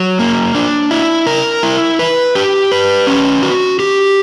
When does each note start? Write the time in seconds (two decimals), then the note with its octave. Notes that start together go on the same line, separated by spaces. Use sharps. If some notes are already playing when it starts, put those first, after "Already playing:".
Already playing: F#3
0.19 A#3
0.55 D4
0.91 E4
1.27 A#4
1.63 E4
1.99 B4
2.35 G4
2.72 B4
3.07 C#4
3.43 F#4
3.80 G4